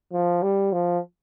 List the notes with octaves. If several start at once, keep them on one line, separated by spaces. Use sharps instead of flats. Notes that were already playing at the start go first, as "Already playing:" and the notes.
F3
G3
F3